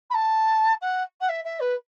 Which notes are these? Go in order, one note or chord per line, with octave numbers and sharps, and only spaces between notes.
B5
A5
F#5
F#5
E5
E5
B4